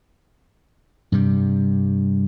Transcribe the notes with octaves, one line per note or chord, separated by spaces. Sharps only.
G2 C3 G3